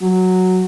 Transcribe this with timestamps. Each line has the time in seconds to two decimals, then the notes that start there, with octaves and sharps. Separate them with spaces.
0.01 F#3